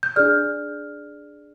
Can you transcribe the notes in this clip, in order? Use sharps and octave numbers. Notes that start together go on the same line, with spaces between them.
G6
D4 G#4 D5 F6